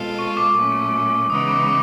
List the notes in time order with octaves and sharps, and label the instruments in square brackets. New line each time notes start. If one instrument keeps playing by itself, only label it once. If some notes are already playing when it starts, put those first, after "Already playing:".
Already playing: [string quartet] B2 G#3 C4 F4 A4
[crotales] C#6
D6
[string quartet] A#2 F#3 A3 C#4
[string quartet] C#3 E3 G#3 B3 D#4 [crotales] D#6
[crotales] D6
D6